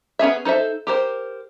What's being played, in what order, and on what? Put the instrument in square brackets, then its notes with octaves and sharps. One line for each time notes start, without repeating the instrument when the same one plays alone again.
[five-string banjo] B3 C#4 G#4 E5
D#4 A4 C5 E5
G4 A#4 C5